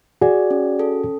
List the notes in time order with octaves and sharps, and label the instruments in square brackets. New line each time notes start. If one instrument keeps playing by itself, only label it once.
[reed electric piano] F#4 G#4 [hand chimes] D5
[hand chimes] C#4
A4